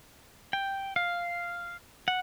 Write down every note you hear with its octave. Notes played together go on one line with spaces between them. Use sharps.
G5
F5
F#5